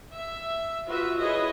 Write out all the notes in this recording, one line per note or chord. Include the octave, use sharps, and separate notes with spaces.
E5
F4 F#4 B4 E5
E4 G#4 B4 C#5 D#5